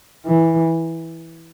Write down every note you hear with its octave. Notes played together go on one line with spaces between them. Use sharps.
E3